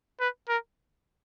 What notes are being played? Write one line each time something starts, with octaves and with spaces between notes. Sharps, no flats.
B4
A#4